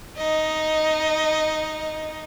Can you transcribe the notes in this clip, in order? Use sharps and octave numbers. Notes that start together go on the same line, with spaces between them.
D#4 D#5